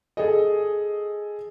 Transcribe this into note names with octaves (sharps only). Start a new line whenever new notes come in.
G#4 A4 D#5